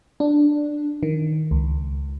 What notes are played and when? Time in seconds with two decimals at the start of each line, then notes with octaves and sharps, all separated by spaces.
0.20 D4
1.03 D#3
1.51 C#2